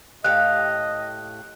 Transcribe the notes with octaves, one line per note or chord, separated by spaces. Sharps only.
A2 G4 D#5 F5 F#6